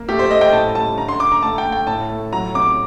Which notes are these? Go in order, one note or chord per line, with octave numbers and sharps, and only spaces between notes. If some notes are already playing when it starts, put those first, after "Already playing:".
Already playing: A#3
A3 G4
C5
A3 D#5
G5
A2 A5
G3 A5
D3 A#5
C6
D3 D6
A#5
A3 A5
G5
A3
G5
A2 A5
A3
F#3 A#5
C3 D6